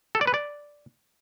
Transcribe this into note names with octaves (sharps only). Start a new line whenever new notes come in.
A4
D5
B4
D5